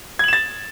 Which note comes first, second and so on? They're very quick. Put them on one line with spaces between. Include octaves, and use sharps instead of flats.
G#6 F#7 E7 A6